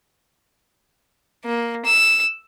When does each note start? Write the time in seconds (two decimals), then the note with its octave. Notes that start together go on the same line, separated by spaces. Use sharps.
1.45 A#3
1.85 E6